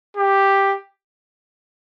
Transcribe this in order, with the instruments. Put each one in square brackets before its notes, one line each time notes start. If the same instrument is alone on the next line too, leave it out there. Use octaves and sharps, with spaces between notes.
[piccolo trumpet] G4